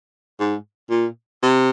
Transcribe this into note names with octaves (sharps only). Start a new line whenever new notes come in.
G#2
A#2
C3